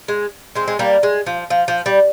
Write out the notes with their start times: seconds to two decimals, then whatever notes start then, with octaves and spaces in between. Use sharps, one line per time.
0.08 G#3
0.55 G#3 C4
0.68 G#3
0.79 G3 A#3
1.03 G#3
1.26 F3
1.50 F3
1.68 F3
1.86 G3